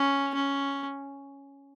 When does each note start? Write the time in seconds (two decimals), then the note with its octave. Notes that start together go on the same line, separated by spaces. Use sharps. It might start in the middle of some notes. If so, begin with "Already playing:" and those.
Already playing: C#4
0.35 C#4